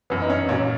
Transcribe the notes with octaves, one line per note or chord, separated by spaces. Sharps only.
F#2 E3 B3
D#4
C#4
A#2 F#3 C#4